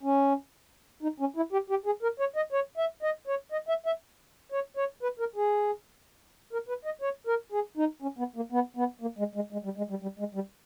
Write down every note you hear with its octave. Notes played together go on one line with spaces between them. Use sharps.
C#4
D#4
C#4
E4
G4
G4
G#4
A#4
C#5
D#5
C#5
E5
D#5
C#5
D#5
E5
E5
C#5
C#5
B4
A#4
G#4
A#4
B4
D#5
C#5
A#4
G#4
D#4
C#4
B3
A#3
B3
B3
A#3
G#3
G#3
G#3
G3
G#3
G3
G3
G#3
G3